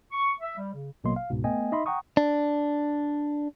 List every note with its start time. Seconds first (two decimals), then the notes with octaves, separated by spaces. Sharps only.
0.12 C#6
0.41 E5
0.56 G3
0.73 C#3
1.04 A1 B2 F#3 A#3 D#5 C6
1.16 F5
1.30 C#2 G#2 B2
1.44 A3 B3 D#5 G5 G#5
1.72 D#4 D#5 E5 B5 C6
1.86 F#5 G5 A#5 C#6 D#6
2.17 D4